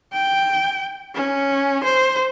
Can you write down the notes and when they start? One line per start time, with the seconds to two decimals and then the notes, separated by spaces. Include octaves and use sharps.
0.13 G5
1.14 C#4
1.84 C5